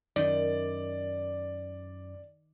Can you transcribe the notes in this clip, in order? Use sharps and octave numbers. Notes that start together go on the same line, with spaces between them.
F#2 D#3 D5